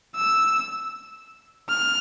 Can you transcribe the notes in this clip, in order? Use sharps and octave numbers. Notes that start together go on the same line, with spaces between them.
E6
F6